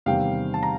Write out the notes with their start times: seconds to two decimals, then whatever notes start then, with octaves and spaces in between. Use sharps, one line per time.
0.06 E2 C3 D#3 G3 F5 G5
0.54 A5
0.63 A#5